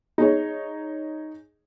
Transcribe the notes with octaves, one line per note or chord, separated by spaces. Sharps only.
D#4 G#4 C#5